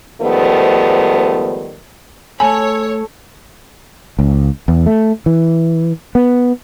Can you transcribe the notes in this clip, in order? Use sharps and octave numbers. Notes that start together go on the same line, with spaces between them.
G#2 D#3 F3 G3 A3 B3
A3 A4 C#5 G#5 B5
C#2
E2
A3
E3
B3